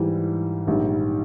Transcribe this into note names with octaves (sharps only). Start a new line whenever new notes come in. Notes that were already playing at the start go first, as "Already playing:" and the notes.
Already playing: G#2 E3 G3
A#1 G#2 D#3 G3